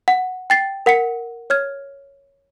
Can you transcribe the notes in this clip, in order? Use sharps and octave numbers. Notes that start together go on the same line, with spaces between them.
F#5
G5 A6 C7
A#4 F#5 B6 C#7
C#5 F6 G#6